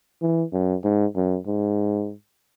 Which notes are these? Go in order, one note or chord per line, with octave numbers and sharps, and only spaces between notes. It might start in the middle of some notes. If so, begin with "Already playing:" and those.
E3
F#2
G#2
F#2
G#2